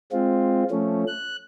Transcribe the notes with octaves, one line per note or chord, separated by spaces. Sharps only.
G#3 C4 F4
F3 A3 C#4
F#6